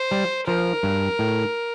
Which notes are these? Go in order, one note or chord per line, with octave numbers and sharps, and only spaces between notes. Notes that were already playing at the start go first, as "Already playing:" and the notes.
Already playing: C5
G3
F3 A#4
G2
A2